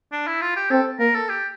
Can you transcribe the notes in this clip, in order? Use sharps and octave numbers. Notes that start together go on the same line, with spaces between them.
D4
E4
F4
G4
C4 A4
A#3 A#4
A4
G4